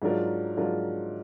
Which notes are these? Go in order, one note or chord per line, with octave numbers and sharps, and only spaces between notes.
G#2 F#3 D4 F4 A#4
G#2 F#3 D4 F4 A#4